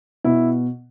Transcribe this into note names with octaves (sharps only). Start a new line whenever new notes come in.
B2 E4